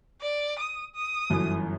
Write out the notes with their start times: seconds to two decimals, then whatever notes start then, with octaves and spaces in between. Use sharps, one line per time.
0.21 D5
0.59 D#6
0.95 D#6
1.30 G1 F#2 E3